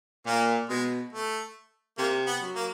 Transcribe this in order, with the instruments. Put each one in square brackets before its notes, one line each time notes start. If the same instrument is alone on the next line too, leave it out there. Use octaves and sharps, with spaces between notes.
[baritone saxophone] A#2 [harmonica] A#3
[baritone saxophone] B2 [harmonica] G#3
[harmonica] A3
[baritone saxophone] C3 [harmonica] A#3
[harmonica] B3
[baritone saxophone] F#3
[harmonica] A#3